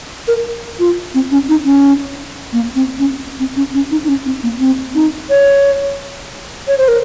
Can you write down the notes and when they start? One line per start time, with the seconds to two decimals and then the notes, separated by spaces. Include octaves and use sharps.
0.28 A#4
0.79 F4
1.14 C4
1.31 C#4
1.49 D#4
1.65 C#4
2.53 A#3
2.75 C4
2.99 C#4
3.39 C4
3.56 C#4
3.74 C#4
3.91 D#4
4.04 D#4
4.08 C#4
4.26 C4
4.43 A#3
4.60 C4
4.95 D#4
5.30 C#5
6.68 C#5
6.78 C5
6.88 A#4